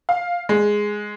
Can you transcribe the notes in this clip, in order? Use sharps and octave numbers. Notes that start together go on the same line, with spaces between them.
F5
G#3